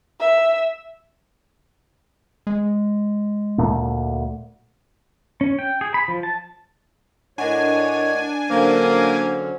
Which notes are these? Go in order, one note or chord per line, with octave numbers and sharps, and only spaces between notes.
E5
G#3
D2 A#2 A3
C#4
G5
G#4
B5
F3
A5
A2 D4 A#4 C#5 D#5 F#5 G#5
D3 F#3 A#3 C#4 C5